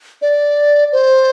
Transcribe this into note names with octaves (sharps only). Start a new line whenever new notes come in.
D5
C5